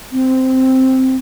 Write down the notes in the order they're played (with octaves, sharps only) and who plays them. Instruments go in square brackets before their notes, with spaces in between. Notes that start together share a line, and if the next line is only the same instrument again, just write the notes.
[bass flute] C4